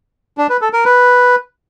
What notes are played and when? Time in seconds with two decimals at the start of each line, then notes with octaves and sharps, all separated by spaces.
0.38 D4
0.50 B4
0.61 A4
0.73 A#4
0.85 B4